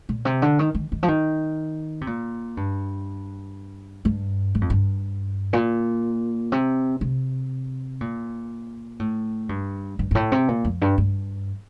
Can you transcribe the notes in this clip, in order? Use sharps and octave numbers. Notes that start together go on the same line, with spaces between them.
A#2
C3
D3
D#3
D#3
D#3
F3
D#3
C3
A#2
G2
G2
G2
F2
G2
A#2
C3
C3
A#2
A2
G2
G2
G2
A2
C3
A#2
F2
G2
G2